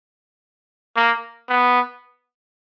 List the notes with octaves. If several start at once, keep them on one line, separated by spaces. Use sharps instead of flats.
A#3
B3